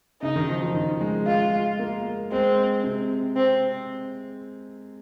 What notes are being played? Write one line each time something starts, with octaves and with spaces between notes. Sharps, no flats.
C#3 D#4
D#3
F3
F3
D#3
G#3
G#3 F4
G#3
A#3
G#3 C4
C3
C4